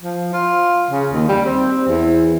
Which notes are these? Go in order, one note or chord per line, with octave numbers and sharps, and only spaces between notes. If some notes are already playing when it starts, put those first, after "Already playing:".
F3
F4
C#3
D#2
G3
C4
E2